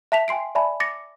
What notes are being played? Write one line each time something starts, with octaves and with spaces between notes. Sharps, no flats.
E5 A5 B6 F7
G5 G#5 C6 C7 D7
D5 E5 G#5 A5 B5
D6 A6 A#6 C#7